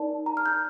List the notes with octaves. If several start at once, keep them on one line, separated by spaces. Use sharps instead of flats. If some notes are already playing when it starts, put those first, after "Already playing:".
Already playing: D#4 A#4 D5 A5
A#5
F6
G6